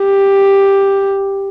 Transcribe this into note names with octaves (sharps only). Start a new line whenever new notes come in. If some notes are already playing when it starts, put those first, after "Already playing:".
Already playing: G4